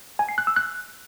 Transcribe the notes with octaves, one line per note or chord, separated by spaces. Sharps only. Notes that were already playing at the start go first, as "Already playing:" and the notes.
G#5
C7
F#6
E6
F#6